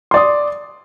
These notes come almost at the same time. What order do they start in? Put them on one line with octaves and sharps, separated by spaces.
C6 D5 D#6